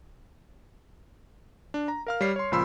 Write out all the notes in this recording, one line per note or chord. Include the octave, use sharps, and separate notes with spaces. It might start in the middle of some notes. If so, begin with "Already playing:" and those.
D4
A#5
A#4 F5 F6
G3 C#5 C7
C#5 C6
C#2 A#2 F3 B5 C6 E6